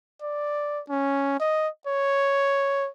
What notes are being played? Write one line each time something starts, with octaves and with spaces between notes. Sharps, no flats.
D5
C#4
D#5
C#5